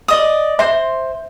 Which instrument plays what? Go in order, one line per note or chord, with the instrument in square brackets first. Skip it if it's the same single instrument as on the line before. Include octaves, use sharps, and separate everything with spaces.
[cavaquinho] D5 D#5 D#6
[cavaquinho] C5 C6 [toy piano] E5